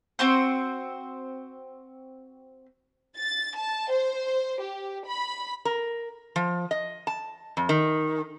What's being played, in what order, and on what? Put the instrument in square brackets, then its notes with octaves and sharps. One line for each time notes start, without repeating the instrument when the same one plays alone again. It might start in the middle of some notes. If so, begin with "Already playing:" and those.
[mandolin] C4 F#4 C5
[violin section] A6
A5
C5
G4
B5
[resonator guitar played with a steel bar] A#4
F3
D#5
A5
F2
D#3